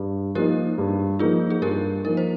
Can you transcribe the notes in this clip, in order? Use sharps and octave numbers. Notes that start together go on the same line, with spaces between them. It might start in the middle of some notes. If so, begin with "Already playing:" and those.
Already playing: G2
F3 A#3 D#4 G4 A#4
G2
F3 A#3 D#4 F4 G#4
G#4
G2 G4 A#4
F3 A#3 D#4 A#4
C5